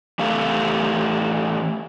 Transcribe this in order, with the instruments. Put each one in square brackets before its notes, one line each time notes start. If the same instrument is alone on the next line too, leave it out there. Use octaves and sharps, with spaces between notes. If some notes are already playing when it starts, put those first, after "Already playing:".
[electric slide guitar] E3 A3 G4 A4 F5